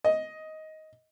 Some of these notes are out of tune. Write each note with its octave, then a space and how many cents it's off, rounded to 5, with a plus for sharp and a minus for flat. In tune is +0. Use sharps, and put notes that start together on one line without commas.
D#5 +10